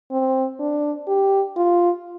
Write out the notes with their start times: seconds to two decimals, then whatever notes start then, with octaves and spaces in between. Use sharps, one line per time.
0.11 C4
0.60 D4
1.08 G4
1.56 F4